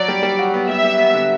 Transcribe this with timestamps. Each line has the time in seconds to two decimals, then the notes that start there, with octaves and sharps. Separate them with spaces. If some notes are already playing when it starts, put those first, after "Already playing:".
Already playing: F#3 D5
0.08 G3
0.23 G3
0.39 F#4
0.54 B3
0.69 G3 E5
0.84 G3
0.99 B3
1.15 D3